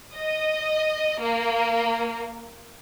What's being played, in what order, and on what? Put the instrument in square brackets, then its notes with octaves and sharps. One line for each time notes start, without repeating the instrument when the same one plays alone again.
[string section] D#5
A#3